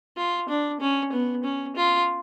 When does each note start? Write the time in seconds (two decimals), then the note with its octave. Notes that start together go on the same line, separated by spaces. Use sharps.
0.17 F4
0.49 D4
0.80 C#4
1.12 B3
1.44 C#4
1.76 F4